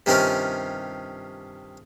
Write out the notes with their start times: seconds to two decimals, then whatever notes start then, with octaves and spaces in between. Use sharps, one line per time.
0.06 G2 C3 D#3 C4 C#4 F4